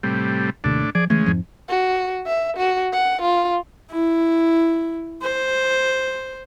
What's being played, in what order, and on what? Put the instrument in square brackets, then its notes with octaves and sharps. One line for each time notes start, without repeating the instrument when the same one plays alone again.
[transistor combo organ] A2 C3 G3
[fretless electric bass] D#2 C3 D#3 [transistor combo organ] A2 D4
[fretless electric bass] F3 [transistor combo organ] G#4 D5
[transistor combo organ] C#3 G#3 [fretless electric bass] E3 A3
[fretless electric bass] F2 G#2 F3
[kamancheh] F#4
E5
F#4
F#5
F4
[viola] E4
C5